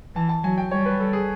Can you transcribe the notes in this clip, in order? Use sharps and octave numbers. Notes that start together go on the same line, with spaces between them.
E3 A5
A5
F#3 G#5
G5
G3 C#5
B4
A4
G#4